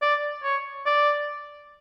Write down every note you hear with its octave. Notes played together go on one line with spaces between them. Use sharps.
D5
C#5
D5